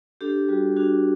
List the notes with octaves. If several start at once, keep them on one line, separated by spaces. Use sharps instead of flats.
D4 G4 A4
G3 F#4 G#4
D4 F#4 G#4